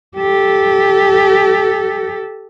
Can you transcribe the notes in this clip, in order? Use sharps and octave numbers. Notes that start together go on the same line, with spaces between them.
G4 A4